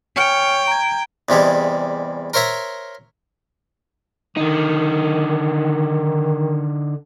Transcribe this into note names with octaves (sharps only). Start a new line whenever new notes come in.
C#5 G5 G#5 F6 C#7
A#5 G#6
E2 C3 G3 G#3
A#4 C5 C#5 E5 A#5
D3 D#3 D#4